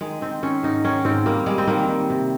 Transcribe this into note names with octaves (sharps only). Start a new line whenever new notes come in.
D#3 G#3
D#3 C4
D#3 C#4
G#2 D#4
D#3 C#4
G#2 C4
G3 A#3
G3 G#3
C4
D#3 A#3
D#3
C3